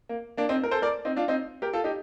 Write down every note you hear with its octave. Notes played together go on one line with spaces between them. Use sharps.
A#3
A#3 D4
C4 D#4
A#4
A4 C5
A#4 D5
C4 D#4
D4 F4
C4 D#4
G4 A#4
F4 A4
D#4 G4